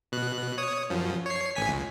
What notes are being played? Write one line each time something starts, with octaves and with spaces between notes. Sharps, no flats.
B2 F#6
C#5 D#6
F#2 F3
C#5 C7
A1 G#5 B6
C#2